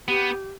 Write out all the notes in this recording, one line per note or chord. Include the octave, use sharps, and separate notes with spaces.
B3 G4